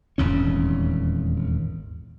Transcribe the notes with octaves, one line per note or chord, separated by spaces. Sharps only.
D#1 G#1 E2 C#4